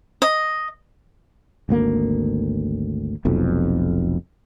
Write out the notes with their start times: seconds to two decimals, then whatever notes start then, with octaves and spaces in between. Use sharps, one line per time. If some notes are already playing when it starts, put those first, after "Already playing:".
0.22 D#5
1.69 G#1 D2 A#3
3.25 F1 B1 F2